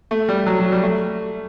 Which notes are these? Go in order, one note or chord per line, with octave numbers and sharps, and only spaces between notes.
A3
G3
F#3
F#3
G3
A3